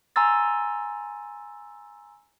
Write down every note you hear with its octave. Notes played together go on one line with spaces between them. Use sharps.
G#5 A#5 C6 E6 A6